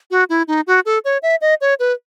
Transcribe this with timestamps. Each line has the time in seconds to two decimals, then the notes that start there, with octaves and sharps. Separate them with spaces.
0.11 F#4
0.30 E4
0.48 D#4
0.67 F#4
0.86 A4
1.05 C#5
1.23 E5
1.41 D#5
1.61 C#5
1.80 B4